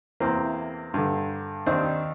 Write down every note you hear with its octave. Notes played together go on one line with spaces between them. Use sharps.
E2 C3 E3 A#3 C4
G2 D3
D#2 D#3 C4 D4